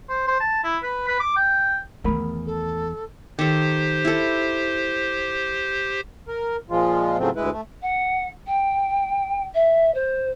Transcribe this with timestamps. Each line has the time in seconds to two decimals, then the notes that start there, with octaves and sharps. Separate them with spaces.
0.09 C5
0.28 C5
0.40 A5
0.64 E4
0.83 B4
1.08 B4
1.20 D6
1.36 G5
2.04 E2 D#3 A3 A#4 B5
2.46 A4
3.39 D#3 G4 A4 C5
4.05 E4 A4
6.28 A#4
6.70 A#2 F3 G#3 F4
7.19 A2 C#3 F#3 A3 C4 F4
7.36 D2 G#3 E4 B4
7.52 A3
7.82 F#5
8.47 G5
9.54 E5
9.94 C5